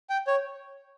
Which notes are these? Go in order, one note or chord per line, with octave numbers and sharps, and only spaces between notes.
G5
C#5